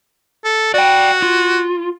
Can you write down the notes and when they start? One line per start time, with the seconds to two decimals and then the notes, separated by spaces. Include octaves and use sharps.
0.44 A4
0.74 F#4 D5 G5
1.22 F4